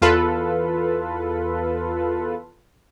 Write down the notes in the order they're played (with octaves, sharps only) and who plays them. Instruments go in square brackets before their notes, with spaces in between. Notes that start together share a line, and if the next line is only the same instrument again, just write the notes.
[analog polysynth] E2 F4 A4 B4